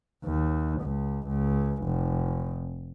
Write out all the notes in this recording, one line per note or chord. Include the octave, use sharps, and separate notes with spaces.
D#2
C#2
C#2
F1